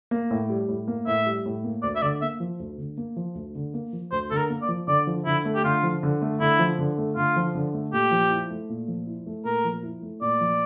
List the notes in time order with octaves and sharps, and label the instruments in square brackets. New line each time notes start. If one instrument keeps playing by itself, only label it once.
[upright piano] A#3
A2
G3
A2
A#3
[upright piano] A2 [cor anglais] E5
[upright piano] G3
A2
A#3
[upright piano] D2 [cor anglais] D5
[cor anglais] E5
[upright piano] D3 [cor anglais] D5
[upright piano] A#3 [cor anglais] E5
[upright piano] F3
D2
D3
A#3
F3
D2
D3
A#3
F3
[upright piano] D2 [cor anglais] C5
[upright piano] D3 [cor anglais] A4
[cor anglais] A#4
[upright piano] A#3
[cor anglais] D5
[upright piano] F3
[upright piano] D3 [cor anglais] D5
[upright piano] F3
[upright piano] D3 [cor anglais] E4
[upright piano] A3
[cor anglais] G4
[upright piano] D3 [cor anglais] F4
[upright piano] F3
D3
A3
[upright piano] D3 [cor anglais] E4
[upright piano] F3
D3
A3
[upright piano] D3 [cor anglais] F4
[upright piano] F3
D3
A3
[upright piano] A#2 [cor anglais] G4
[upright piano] F3
E4
A3
A#2
F3
E4
A3
[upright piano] A#2 [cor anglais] A#4
[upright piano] F3
E4
A3
[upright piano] A#2 [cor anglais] D5
[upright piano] F3